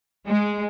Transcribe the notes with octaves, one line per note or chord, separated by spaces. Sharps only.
G#3